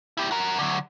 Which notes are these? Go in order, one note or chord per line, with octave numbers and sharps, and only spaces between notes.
E4 G4
F#4 A#4
D3 F#3